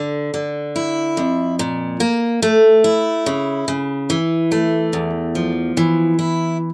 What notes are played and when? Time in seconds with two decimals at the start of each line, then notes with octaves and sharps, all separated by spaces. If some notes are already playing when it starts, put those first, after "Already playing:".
Already playing: D3
0.34 D3
0.76 E4
1.17 F2
1.59 A#2
2.00 A#3
2.42 A3
2.84 E4
3.26 C#3
3.68 C#3
4.10 E3
4.52 A3
4.93 E2
5.35 F3
5.77 E3
6.19 E4